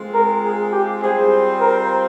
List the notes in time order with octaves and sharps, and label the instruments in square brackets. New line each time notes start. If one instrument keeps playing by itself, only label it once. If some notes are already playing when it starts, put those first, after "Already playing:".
Already playing: [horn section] G#3 C4 F4
[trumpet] A#4
G#4
G4
[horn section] G3 C4 F4 C5 [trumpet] G#4
[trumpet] A#4